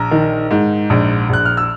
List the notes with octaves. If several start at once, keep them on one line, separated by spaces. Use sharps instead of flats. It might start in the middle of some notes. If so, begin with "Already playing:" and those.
Already playing: A#1 A#5
D#3
G#2
A#1
A#1 F#6
F6
E6